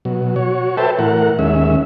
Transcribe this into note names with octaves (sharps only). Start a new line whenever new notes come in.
B2 F#3
F#4 C#5
A4 B4 C5 E5 G5 A5
A2 E3 A#4 F#5
D#2 G#3 C#4 E5